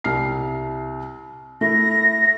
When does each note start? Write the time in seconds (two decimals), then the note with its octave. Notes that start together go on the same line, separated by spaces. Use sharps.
0.04 C2 F6 C7
1.61 A3 E4 A#6